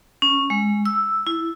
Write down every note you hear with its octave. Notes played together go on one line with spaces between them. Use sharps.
C#4
G#3
E6
E4